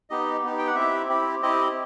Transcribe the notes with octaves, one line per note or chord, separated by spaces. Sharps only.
B3 D#4 G4 D#5
B3 D#4 G4
G5
F#5
C4 E4 G4 E5
C4 E4 G4
C4 E4 G4 D#5